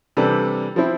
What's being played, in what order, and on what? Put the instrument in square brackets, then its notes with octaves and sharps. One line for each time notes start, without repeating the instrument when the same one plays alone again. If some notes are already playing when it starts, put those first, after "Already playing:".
[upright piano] C3 E3 G3 D4 A4
F3 C4 E4